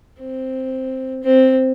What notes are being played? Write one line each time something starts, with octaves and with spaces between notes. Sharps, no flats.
C4
C4